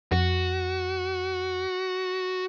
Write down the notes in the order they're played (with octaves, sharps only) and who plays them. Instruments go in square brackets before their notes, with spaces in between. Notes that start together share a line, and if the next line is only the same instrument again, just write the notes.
[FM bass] F2 [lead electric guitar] F#4